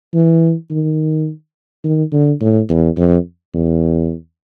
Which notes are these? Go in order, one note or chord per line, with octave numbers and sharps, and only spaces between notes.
E3
D#3
D#3
D3
A2
E2
F2
E2